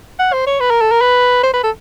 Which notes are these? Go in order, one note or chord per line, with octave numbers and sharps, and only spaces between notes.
F#5
C5
C#5
B4
A#4
A4
A#4
B4
C5
B4
A4